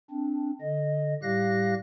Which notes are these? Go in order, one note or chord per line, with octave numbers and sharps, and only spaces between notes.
C4 D4
D3 D#5
A2 G3 G4 F5 F#6 A#6